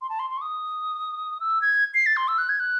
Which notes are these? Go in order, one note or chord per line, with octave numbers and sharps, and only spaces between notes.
C6
A5
C6
C6
C#6
D#6
E6
G#6
C7
A6
C6
E6
F#6
G#6
F#6